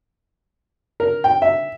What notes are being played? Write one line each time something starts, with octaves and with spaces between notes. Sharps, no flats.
A#4
G5
E5